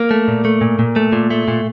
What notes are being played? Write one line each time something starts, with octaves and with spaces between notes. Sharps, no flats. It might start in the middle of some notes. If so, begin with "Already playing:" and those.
Already playing: A#3
A3
A#2
A3
A#2
A#2
A3
A#2
A3
A#2